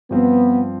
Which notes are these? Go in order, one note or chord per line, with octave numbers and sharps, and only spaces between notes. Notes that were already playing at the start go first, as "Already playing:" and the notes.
G2 F3 B3 C4 F4